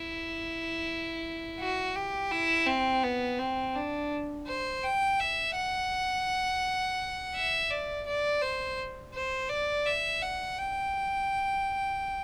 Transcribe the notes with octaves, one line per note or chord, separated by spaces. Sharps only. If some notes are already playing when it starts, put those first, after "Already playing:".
Already playing: E4
F#4
G4
E4
C4
B3
C4
D4
C5
G5
E5
F#5
E5
D5
D5
C5
C5
D5
E5
F#5
G5